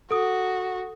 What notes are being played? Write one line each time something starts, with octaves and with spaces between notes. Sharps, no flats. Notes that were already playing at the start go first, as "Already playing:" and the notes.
F#4 A4 D#6